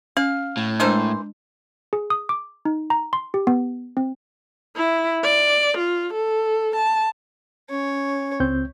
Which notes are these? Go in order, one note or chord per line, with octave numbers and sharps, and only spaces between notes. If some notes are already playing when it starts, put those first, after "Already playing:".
C#4 F5
A2
E3 G#3 D4 A#4 C5
G#4
D#6
D6
D#4
A#5
C6
G4
B3
C4
E4
D5
F4
A4
A5
C#4 C#5
C#2 C4 G6